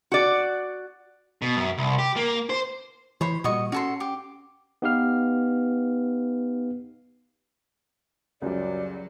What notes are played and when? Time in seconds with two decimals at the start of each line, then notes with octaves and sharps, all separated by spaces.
0.12 F#4 D5
1.42 B2
1.56 F#2
1.78 C2
1.98 G4
2.16 A#3
2.50 C5
3.21 E3 C5 C#5 B5
3.44 A#2 G3 F#4 D#5 C#6
3.72 C#4 F#4 A4 C6
4.00 G4
4.82 B3 D#4 G4 B4 F5 F6
8.42 C#2 F#2 F#3 G3 D5